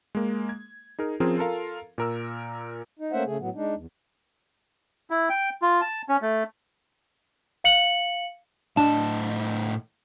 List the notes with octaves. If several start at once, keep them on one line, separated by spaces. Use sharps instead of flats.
G#3 A#3
G#6
D#4 G#4 A#4
F3 C4 C#4 F4 G#4 A#4
F4 A4 A#4 F5
A#2 A#4 E6
D#4
A3 A#3 C#4 C5 E5 F#5
C#3 A3 G#4
A2 F#3 B3
G#3 D4 D#4
E2
E4
G5
F4
A5
C#4
A3
F5 C#7 F#7
A2 D4 D#5 A5